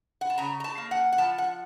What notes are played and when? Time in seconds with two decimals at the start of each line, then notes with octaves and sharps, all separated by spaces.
0.21 F#5
0.30 A5
0.38 C#3 A#5
0.60 A#5
0.64 A5
0.78 A#3
0.91 F#5
1.12 F#5
1.18 F3 A5
1.38 F#5